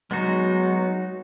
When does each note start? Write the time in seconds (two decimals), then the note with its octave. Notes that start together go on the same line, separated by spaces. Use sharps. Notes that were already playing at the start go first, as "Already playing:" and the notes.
0.11 F#3 G#3 B3 D#4 F#4